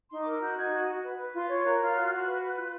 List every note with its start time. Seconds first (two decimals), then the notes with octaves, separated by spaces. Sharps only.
0.11 D#4 C6
0.21 A#4 D6
0.32 E6
0.41 F#4 G6
0.57 D#4 G#6
0.73 F#4
0.87 F#4
1.03 B4
1.18 B4
1.34 F4
1.49 C#5
1.64 A#4 F#6
1.75 F#6
1.80 F4 F6
1.95 F#4 F#6
2.11 F#4
2.25 B4
2.41 B4
2.56 F4